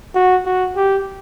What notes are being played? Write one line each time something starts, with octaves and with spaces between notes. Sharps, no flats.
F#4
F#4
G4